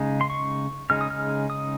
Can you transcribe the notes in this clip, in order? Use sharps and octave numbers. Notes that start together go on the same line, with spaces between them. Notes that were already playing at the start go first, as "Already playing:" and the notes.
Already playing: C#3 G#3 D#4
C6
C#6
C#3 G#3 D#4 F6
D#6
F6
D#6